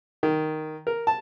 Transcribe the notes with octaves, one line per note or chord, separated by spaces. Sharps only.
D#3
A#4
A5